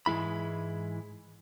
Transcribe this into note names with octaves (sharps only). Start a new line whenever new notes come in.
G#2 E3 G#3 E4 B5